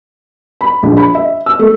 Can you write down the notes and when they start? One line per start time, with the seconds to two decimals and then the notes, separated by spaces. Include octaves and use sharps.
0.61 B5
0.83 A#1
0.97 B5
1.15 E5
1.46 E6
1.59 A3